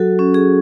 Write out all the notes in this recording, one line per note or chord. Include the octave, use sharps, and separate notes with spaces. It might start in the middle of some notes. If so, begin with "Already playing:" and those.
Already playing: F#3 F#4 A4
C#4
G#4